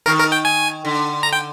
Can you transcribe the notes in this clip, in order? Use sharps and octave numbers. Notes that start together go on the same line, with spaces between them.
D#3 A#4
A#4
G5
G#5
D3
A#5
G5